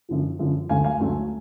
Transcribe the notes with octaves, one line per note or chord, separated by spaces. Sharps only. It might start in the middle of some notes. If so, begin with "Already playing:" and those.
F#2 D3 F3
F#2 D3 F3
D2 D3 F#3 A3 F5 G#5
F5 G#5
D2 D3 F#3 A3